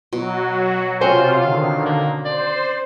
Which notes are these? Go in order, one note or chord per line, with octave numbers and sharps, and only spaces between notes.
B2 F#3 F#4
C3 C4 C#4 F4 C5 F#5
D3 D#3 F5
A#3
C5 D5